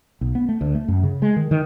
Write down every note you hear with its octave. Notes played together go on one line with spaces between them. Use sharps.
B1
B3
A3
D2
A3
F#2
C#3
G#3
D#3
D#3